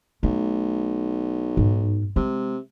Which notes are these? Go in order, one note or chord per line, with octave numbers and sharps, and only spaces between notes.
B1 A3
G#2
C3 G#3